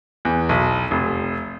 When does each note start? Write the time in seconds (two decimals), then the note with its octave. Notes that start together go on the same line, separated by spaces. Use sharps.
0.25 E2
0.49 B1
0.91 F1